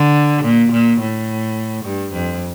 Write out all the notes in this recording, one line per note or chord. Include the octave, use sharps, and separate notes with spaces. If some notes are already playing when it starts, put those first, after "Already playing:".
Already playing: D3
A#2
A#2
A2
G2
F2